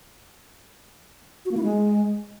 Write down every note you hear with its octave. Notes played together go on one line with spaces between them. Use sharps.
F#4
A#3
E4
G#3